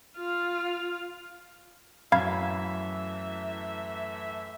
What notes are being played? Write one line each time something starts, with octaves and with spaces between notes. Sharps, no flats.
F4 F5
F#2 A2 E3 E5 F5 B5 G#6